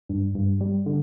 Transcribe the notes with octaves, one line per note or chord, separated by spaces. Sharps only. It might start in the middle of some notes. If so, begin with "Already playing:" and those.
G2
G2
G3
D3